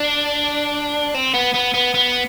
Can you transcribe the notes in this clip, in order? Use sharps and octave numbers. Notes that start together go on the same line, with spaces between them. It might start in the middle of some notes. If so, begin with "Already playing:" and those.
Already playing: D4
C4
B3
B3
B3
B3